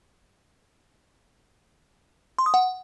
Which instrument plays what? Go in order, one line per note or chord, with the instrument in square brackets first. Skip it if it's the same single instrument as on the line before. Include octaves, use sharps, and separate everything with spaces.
[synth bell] C6
D#6
F#5